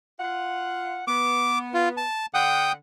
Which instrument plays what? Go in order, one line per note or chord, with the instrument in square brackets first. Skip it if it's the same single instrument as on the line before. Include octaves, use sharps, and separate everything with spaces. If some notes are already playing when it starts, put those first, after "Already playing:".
[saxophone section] F4 F#5
[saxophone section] B3 [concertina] D6
[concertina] F4
A5
[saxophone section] D3 F#5 [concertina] G5 D#6